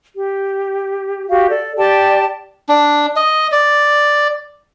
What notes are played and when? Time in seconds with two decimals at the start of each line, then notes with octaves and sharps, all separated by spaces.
0.16 G4
1.29 F#4 G4 F5
1.49 A4 D5
1.77 G4 D5 G5 A5
2.69 D4
3.16 D#5
3.52 D5